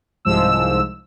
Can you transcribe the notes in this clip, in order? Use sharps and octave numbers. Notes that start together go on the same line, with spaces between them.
C2 G#2 F3 G#3 E6